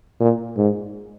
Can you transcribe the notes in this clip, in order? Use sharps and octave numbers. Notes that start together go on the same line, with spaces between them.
A#2
G#2